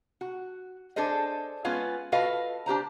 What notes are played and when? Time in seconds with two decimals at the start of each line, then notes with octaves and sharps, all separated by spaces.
0.21 F#4
0.96 D4 G#4 A4 C5 D#5
1.65 G#3 B3 C#4 F4 B4 F5
2.12 F4 F#4 A4 B4 D#5 F5
2.66 D4 G4 C5 A#5